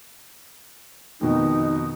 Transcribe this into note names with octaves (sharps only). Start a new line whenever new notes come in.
F2 B2 D#3 D#4